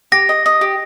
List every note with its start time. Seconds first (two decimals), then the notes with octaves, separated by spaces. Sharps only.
0.12 G4 A#6
0.29 D#5
0.46 D#5
0.61 G4